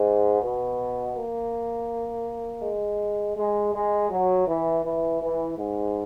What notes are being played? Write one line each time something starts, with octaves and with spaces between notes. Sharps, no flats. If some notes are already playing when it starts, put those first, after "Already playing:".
Already playing: G#2
B2
A#3
G#3
G#3
G#3
F#3
E3
E3
E3
G#2